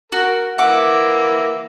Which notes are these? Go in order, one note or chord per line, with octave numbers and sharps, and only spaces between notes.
F#4 A#4
E3 A#3 E5 F#5 D6